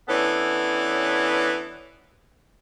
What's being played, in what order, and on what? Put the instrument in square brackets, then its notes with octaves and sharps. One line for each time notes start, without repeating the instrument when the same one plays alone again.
[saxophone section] E3 B3 C#4 D4 A4 C#5